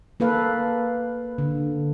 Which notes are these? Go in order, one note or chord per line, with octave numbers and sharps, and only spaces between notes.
A#3 A4 B4 F5
D3